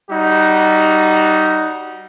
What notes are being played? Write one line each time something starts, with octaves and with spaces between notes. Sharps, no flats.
G3 D#4 F#4